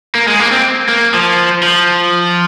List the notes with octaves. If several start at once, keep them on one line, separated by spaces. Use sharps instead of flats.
A#3
G#3
A#3
C4
A#3
F3
F3